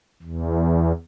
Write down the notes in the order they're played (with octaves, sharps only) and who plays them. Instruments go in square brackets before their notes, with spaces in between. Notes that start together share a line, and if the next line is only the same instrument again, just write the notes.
[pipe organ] E2